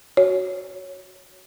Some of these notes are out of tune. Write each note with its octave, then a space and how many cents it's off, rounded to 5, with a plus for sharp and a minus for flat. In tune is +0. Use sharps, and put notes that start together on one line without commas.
F#4 +0 C#5 +0